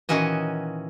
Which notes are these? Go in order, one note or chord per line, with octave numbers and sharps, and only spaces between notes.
A#2 D#3 E3 C#4 F#4 D#5